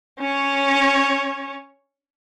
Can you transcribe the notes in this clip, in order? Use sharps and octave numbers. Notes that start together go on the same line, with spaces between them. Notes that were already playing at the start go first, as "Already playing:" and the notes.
C#4 C#5